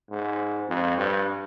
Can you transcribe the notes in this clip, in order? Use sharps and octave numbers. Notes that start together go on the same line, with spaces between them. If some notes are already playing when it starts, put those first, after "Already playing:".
G#2
F2
G2